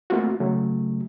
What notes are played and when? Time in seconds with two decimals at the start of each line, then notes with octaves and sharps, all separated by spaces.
0.10 A3 A#3 C4 F4 F#4
0.40 C#3 F#3 A3